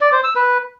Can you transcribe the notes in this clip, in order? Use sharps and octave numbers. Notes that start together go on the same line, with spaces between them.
D5
C5
E6
B4